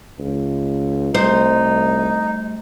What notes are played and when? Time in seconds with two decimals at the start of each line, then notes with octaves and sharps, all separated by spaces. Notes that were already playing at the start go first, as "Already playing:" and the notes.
0.19 C#2
1.15 C2 G3 A3 D#4 C5